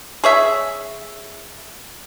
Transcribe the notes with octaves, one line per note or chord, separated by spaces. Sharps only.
G#4 C#5 E5